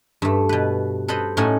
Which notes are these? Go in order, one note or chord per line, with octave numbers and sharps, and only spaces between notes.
G2 A3
B2 B4
A4 B4 C5 D#5 B5
A2 C#4 D#4 A4 F#5 G#5